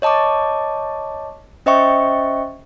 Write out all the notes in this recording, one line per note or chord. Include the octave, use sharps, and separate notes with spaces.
C#5 D#5 A5 C#6 D6
C#4 C5 D#5 E5 G5 C#6